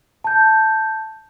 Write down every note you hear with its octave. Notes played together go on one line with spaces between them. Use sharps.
A5 G6